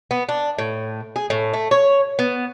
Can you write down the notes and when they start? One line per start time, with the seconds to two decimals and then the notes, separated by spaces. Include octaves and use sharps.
0.11 B3
0.29 D4
0.59 A2
1.16 G#4
1.30 A2
1.53 A3
1.71 C#5
2.19 B3